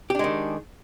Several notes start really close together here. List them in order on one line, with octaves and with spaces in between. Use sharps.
G4 D4 G#3 D#3